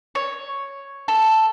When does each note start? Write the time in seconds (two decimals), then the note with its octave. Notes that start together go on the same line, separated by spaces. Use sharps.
0.15 C#5
1.08 A4